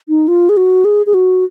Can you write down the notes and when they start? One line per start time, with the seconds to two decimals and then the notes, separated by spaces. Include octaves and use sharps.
0.09 D#4
0.28 F4
0.49 G#4
0.57 F#4
0.85 G#4
1.06 G#4
1.14 F#4